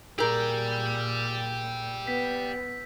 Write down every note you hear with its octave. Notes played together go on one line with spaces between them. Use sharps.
A#2 G4 G#4 A#4 D5 E6 G6
B3 B6